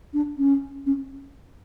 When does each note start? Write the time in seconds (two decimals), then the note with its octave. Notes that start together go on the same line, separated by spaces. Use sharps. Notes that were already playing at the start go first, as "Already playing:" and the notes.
0.13 D4
0.38 C#4
0.86 C#4